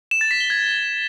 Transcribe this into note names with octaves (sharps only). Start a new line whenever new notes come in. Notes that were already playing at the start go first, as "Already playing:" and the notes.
E7
A6
B6
G7
G#6